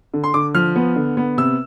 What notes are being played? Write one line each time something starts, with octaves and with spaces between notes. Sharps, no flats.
D3
C6
D3 D6
F3 F6
B3
D3
B3
C3 E6